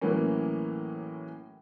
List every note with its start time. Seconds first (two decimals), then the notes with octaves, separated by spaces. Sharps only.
0.01 A2 E3 F#3 A#3 C#4